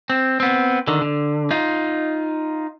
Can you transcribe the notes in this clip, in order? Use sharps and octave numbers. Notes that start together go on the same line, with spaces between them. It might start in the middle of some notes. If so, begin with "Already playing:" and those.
C4
B3 C4
D3 D#3
D3
D#4 F4